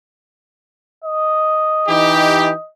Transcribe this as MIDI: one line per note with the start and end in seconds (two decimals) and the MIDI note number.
1.04 2.70 75
1.87 2.51 52
1.87 2.51 63
1.87 2.51 67